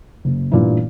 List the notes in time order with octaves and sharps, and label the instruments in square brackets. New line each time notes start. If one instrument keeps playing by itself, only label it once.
[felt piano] F#1
A1 G2 A#2 E3 E4